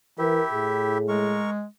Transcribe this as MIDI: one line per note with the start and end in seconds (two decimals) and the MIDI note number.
0.19 0.41 52
0.19 0.98 64
0.19 0.98 67
0.19 0.43 70
0.19 0.98 76
0.53 1.46 45
0.53 1.46 68
1.08 1.65 56
1.08 1.50 70
1.08 1.50 85